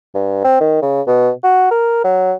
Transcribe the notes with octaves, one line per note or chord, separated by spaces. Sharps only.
G2
C4
D#3
C#3
B2
F#4
A#4
F#3